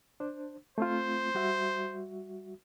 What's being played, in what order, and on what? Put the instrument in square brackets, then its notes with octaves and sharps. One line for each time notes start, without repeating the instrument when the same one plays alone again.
[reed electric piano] D4 C5
[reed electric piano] A3 C4 F4 [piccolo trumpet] C5
[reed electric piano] G3 F#4 E5